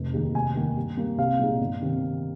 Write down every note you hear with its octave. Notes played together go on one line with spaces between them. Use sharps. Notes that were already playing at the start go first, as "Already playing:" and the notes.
Already playing: F1
D#2 D#3 G#3 D#4
F1 G#5
D#2 D#3 A#3
G2
G3 A#3
C2 F5
A#2 G#3 D#4
G1
C3 D#3